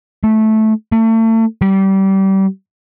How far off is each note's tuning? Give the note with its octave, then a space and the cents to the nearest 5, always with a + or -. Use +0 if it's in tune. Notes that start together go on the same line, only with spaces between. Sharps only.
A3 -10
A3 +35
G3 -25